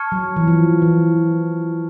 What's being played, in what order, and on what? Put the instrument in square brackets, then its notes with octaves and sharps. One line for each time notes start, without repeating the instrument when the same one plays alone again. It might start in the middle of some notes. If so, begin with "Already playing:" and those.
Already playing: [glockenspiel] A5 C#6 F6 G#6 C#7
[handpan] F#3
E3
F3
E3